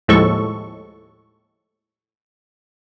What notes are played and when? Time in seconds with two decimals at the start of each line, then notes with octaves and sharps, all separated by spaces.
0.08 D#2 A2 F3 G#3 A4 C#6